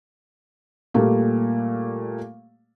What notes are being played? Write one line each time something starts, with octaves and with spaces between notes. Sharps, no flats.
A#2 G3 A3 A#3